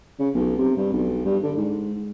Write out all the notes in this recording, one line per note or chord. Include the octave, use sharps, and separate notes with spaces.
C#3
B1
C3
G2
B1
G2
D3
G#2